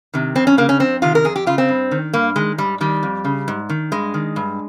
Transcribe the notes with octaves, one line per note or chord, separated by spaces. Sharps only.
C3 D#3
F2 C4
C#4
C#3 A#3
C#4
F2 C4
C3 D#3 F4
A#4
F2 G#4
G4
C#3 F4
C4
G2
D#3
G2 A#3
D#3 G#3
G#2 G3
D#3 G3
F2
C#3
G#2
D#3
G2 G#3
D#3
G2